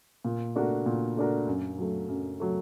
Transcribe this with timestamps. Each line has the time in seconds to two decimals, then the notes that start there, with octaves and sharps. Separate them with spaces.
0.25 A#2
0.56 A3 D4 F#4 A#4
0.86 A#2
1.17 A3 D4 F#4 A#4
1.47 F#2
1.78 F#3 A3
2.09 F#2
2.40 F#3 A3